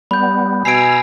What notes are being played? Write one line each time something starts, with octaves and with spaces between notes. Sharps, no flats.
G3 B3 B5 G6
B2 G#5 A#5 E6 C7 D7